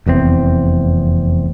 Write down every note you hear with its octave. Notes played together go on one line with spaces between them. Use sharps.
F1 E2 C3 C4